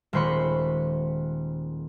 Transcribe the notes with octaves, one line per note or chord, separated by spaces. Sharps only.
D#1 G#3 C5 B5 C#6